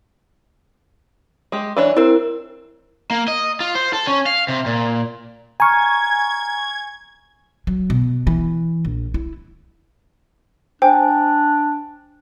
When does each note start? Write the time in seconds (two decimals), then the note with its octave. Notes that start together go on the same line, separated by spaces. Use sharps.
1.52 G#3 G4
1.77 E3 D4 C#5
1.97 C4 E4 A#4
3.11 A#3
3.28 D#5
3.60 F4
3.75 C5
3.93 A4
4.07 C#4
4.26 F5
4.48 C3
4.66 A#2
5.60 G#5 A#5 C#6 F6 G#6
7.67 F#3
7.90 B2
8.27 E3
8.85 A#1
9.14 E4
10.82 D4 C5 G5 G#5